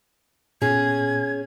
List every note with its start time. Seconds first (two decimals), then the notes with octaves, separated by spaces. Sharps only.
0.62 A#2 B3 C#4 G#4 G#6